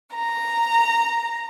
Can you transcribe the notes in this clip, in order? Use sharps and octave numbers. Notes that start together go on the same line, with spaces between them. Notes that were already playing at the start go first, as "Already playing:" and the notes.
A#5